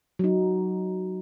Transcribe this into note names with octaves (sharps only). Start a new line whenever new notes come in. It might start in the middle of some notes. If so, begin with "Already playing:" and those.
F#3 D#4